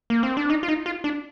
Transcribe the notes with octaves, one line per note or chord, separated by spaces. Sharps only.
A#3
C4
D4
D#4
F4
D#4
F4
D4